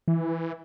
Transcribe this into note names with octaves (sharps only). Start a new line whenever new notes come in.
E3